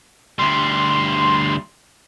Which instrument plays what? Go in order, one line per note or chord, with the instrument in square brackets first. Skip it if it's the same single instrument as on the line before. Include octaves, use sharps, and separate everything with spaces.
[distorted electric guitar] D2 G3 [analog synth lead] C6